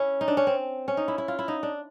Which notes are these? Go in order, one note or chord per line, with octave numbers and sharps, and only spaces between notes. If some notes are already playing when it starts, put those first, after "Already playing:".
Already playing: C#4 E4
D#4
D4
C#4
C4
C#4
D#4
E4
E4
F4
E4
D#4
D4